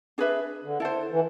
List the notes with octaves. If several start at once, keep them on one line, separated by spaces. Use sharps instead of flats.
D4 G#4 B4 E5
D3
E4 A4 C5
E3